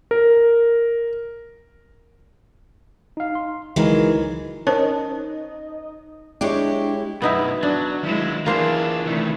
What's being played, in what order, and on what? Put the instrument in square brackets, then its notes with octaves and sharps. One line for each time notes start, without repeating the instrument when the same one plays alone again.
[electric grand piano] A#4
[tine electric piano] D#4 F5
C6
[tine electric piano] C#2 D#4 A#4 [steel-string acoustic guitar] E3 F#3 G#3
[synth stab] C#4 [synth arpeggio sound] D#4 D#5 [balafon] A#4 C5 A5
[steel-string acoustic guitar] G#3 E4 G4 [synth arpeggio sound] D4 C#5
[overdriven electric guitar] F#2 B2 [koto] B3 D#4 E4
[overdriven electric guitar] F#3 [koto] D4
[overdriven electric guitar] D#3 F#3 [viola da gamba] G#3 E4
[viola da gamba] E3 D4 [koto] A#3 C5 A#5 [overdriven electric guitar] F4 G#4
[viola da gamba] C3 A3 [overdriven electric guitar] D#3 E3